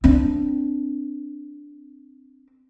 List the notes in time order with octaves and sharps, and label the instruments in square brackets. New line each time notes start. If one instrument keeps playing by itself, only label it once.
[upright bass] C4 D4